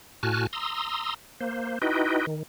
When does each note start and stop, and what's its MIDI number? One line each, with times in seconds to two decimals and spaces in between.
0.23 0.47 45
0.23 0.47 66
0.23 0.47 80
0.23 0.47 81
0.23 0.47 89
0.23 0.47 90
0.53 1.14 82
0.53 1.14 84
0.53 1.14 87
0.53 1.14 88
1.41 1.79 58
1.41 1.79 72
1.82 2.26 63
1.82 2.26 64
1.82 2.26 66
1.82 2.26 71
1.82 2.26 75
1.82 2.26 79
2.27 2.43 51